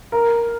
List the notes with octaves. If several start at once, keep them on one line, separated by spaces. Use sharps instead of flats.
A#4